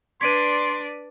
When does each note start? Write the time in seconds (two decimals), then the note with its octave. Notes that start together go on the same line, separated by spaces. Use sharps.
0.21 D4 B4 D5 C6 G#6 B6 D7 D#7